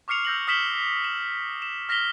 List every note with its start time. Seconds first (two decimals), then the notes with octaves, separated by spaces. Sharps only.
0.08 C#6 D6 F6 C7 C#7 F7
0.25 E6 G6 A#6 F7 F#7
0.47 D#6 F6 B6 E7 F#7 G7
1.04 E7 F#7
1.62 E7
1.89 F6 A#6 B6 F7 G7